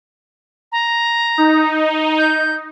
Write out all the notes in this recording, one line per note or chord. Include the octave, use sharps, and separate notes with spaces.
A#5
D#4
G6